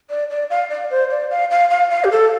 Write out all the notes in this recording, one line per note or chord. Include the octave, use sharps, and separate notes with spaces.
D5
D5
F5
D5
C5
D5
F5
F5
F5
F5
G4
A4